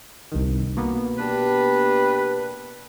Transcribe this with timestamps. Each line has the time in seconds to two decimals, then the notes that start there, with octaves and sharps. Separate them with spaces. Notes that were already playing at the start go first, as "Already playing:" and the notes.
0.32 C2 G2 D#3
0.77 B2 A#3 B3
1.18 D4 G4 B4